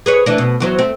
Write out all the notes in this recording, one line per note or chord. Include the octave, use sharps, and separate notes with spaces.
G#4 B4 C#5
E3 A3 D4
B2
E2 F#3 C5
A3 C4